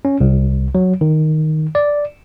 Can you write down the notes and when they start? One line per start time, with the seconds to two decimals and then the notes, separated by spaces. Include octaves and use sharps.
0.05 C#4
0.20 C2
0.75 F#3
1.01 D#3
1.75 D5